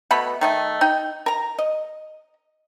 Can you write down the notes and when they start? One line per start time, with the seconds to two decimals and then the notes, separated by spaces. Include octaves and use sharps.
0.11 B2 A3 B3 B5
0.41 D#3 A3 D#5
0.81 D#4 G5
1.26 A#4 A#5
1.59 D#5